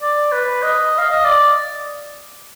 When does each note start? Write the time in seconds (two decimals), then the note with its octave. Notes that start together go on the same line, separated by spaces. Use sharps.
0.02 D5
0.32 B4
0.63 D#5
0.98 F5
1.10 D#5
1.25 D5